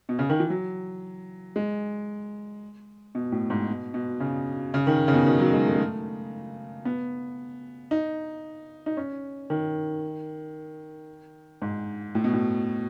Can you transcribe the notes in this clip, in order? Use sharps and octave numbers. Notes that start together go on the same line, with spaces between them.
B2
C#3
D#3
E3
F#3
G#3
B2
A2
G#2
B2
B2
C#3
C#3
D#3
C#3
B2
D#3
F#3
G#3
A3
G#3
A3
B3
D#4
D#4
C#4
D#3
G#2
A2
B2
A2